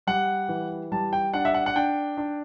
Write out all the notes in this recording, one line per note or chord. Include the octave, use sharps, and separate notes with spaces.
G3 F#5
E3
G3 A5
G5
D4 F#5
E5
F#5
F#5
D4 G5
D4